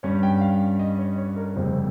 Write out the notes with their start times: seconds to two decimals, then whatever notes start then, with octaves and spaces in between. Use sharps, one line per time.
0.03 G2 G3 C#4 C#5
0.23 G5
0.41 F5
0.79 D#5
0.99 C#5
1.18 C#5
1.36 A#4
1.56 F1 F2 C#3 G3 C5